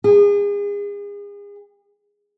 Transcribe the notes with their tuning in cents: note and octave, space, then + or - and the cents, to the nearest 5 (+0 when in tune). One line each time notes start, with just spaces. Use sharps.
G#4 -35